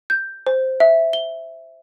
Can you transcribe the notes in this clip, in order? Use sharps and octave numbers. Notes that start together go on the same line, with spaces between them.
G6
C5
E5
G7